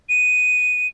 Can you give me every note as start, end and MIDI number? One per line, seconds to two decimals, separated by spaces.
0.09 0.87 99